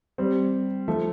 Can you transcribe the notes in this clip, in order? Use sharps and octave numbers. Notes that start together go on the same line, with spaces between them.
G3 C4
F3 A3